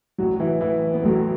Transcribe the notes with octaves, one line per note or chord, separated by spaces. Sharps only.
A1 A2 F#3 F#4
E3 E4
E3 E4
B3
A1 A2 F#3 A3